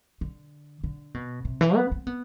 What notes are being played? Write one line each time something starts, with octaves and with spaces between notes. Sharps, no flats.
D3
D3
B2
C3
E3
B3
C4
B3